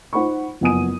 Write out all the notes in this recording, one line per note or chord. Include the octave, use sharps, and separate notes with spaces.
D#4 C5 F#5 B5 C#6
F#1 F2 B3 G#5 D#6 D#7